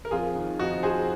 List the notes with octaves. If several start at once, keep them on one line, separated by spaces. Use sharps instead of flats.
A#4
F2 F4 G#4
D#3
F2 D#4 F#4
F2 G#4 C5